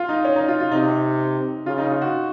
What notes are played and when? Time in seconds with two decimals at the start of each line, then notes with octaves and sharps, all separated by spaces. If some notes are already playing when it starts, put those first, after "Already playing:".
Already playing: F4
0.09 D#4
0.25 C#4
0.36 D#4
0.48 F4
0.60 F4
0.72 C3 D#4
1.66 C#3 F4
1.78 D#4
1.90 F4
2.02 F#4